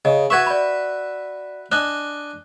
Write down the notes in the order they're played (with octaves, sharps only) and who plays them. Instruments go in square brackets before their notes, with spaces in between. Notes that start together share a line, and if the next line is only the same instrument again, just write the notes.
[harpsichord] C#3 [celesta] D#5
[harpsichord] F#4 B4 E5 [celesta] C#6 G#6
[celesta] D5 B5
[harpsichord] D4 D#5 G#5 [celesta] F#6